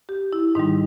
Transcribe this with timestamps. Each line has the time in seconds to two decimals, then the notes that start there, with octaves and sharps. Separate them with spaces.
0.09 G4
0.33 E4
0.55 G#2 D#3 G3 D#4